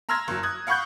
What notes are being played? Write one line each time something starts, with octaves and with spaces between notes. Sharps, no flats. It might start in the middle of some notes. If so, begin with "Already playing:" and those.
A#5 C6 E6 F6 G#6 A#6
F#1 F#3
D#6 F#6 G#6
F5 F#5 B5 C#6 F#6 G6